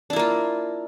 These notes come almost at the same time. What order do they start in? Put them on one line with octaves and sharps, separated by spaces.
D4 E4 A#3 F4